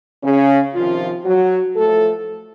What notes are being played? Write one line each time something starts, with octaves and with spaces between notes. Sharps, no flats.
C#3 C#4
C3 D#3 F3 F4
F#3 F#4
A2 F3 A3 A4